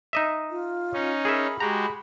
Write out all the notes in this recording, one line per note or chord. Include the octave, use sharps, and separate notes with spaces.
D#4 D#5 E5
F4
C#4 D#4
G#4 A#4 E5 B5
G#3 F#4 G4 A#5